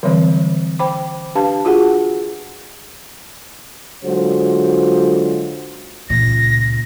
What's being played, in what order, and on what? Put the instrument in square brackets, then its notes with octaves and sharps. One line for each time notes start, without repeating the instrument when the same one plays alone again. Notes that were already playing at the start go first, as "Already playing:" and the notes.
[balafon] D3 E3 F#3 G3 C4 C5
C5 G5 B5 D6
D4 G4 B4 F5 A5
F4 F#4 G#4 F#5
[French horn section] D3 F#3 G#3 F4 F#4 C5
[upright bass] C#2 A#2 [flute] A#6